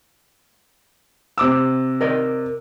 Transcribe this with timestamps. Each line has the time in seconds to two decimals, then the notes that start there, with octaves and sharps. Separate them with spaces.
1.38 C3 D6 E6
2.01 A#4 D5 D#5